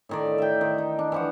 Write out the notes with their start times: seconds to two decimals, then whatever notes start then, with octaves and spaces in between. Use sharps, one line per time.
0.09 A2 D#3 D5
0.38 E5 G5
0.61 D#3
0.78 D#4
0.99 D4
1.12 E3 F3 F#5